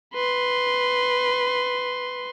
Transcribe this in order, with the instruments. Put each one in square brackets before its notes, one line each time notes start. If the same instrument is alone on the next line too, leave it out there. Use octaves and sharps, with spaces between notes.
[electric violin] B4 C6